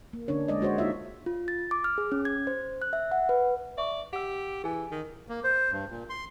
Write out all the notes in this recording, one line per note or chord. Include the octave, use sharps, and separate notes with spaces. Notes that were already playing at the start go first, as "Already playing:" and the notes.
A#3
D3 C#4 D4 C#5
G#3 D5 D#5
G#3 F#4 C5 C#5
A#3 D#4 F4 E5
F4
A6
D6
F6
G#4
C#4
G#6
C5
F#6
E5
F#5
B4
D5 E5 C#6
G4 F#5 E6
E3 G#4 G#5
D#3
A#3
C5
G2
A#2
C6